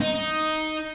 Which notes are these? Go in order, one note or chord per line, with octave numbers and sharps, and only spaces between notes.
D#4